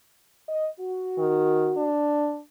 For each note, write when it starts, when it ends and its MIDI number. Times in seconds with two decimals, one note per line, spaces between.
0.49 0.68 75
0.80 1.89 66
1.18 1.72 51
1.77 2.39 62